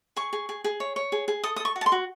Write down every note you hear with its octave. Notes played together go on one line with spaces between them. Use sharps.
G#4 C#6
G#4
G#4
G#4
C#5
C#5
G#4
G#4
A4 D#6
D#6
A4
C#6
F#4
A5
C6
F#4